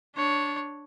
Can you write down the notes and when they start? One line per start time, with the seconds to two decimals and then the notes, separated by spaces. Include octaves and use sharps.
0.16 D4 C#5